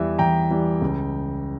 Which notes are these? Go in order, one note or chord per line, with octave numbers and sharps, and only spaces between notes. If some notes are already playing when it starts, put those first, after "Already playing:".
Already playing: E2 E3 G3 E5
E2 G5 A#5
E3 G3
C#2